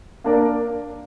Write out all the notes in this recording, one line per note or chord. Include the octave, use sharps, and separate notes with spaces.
A#3 D4 A#4 D5